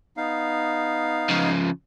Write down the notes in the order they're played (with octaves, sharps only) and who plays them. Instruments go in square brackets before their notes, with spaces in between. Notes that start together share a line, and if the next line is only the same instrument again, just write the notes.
[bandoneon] B3 D#4 F5
[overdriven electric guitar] C#3 F3